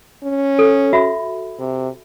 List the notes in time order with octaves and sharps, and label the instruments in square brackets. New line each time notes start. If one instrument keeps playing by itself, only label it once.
[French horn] C#4
[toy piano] A4
F#4 E5 B5
[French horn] C3